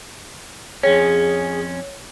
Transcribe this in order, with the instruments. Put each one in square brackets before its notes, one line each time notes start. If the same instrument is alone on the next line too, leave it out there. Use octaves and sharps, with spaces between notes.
[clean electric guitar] F2 C#4 [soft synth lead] G#4 [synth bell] C#5